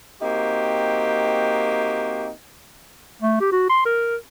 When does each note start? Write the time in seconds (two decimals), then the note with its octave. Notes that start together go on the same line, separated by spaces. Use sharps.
0.21 A#3 C4 D#4 F#4 G4
3.22 A3
3.40 G4
3.52 F#4
3.70 C6
3.85 A#4